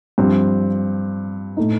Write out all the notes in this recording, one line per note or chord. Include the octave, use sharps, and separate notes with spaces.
G2 F3 C4
A2 A3 D#4